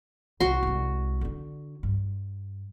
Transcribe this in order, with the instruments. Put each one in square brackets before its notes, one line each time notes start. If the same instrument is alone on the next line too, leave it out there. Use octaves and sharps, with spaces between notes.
[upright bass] C2 [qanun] F#4 C6
[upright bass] C2 G#3
D3 D4
G2